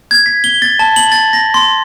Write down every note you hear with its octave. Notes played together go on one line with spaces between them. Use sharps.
G#6
B6
G7
A6
A5
F#7
A6
A#6
C6